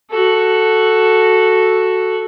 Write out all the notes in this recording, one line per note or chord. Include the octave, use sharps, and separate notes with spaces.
F#4 A4